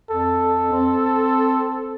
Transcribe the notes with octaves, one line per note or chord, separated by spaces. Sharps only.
F2 A4
C4